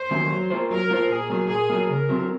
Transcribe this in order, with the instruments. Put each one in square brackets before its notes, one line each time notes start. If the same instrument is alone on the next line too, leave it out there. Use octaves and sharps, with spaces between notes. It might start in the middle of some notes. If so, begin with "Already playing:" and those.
Already playing: [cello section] C5
[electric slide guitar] D#3 F#3 A#3 C#4
F#3
A#3 F4 C5
[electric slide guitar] F#3 [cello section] A#4
[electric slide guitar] A#3 F4 C5
[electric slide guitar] A#2 [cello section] G#4
[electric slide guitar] F#3 A#3
[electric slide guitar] A#2 [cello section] G#4
[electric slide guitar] F#3 A#3
[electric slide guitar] C#3 [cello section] A#4
[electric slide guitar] F#3 C4